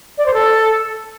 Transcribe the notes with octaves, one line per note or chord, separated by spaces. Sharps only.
D5
C5
A4